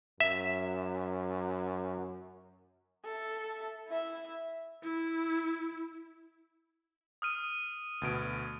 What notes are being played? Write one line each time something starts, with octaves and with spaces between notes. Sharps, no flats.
F#2 E5
A4 E5
E4 E5
E4
D#6 F6 D#7
D2 B2 D7